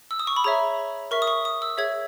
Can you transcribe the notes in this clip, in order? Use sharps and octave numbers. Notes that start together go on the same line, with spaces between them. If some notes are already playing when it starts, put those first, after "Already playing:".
E6
D#6
C#6
B5
G#4 C#5 E5 A#5
A#4 E5 C#6
D#6
C#6
D#6
E6
G#4 C#5 E5 G#6